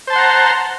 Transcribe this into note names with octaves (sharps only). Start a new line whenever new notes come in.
C5 F#5 A5 A#5 C6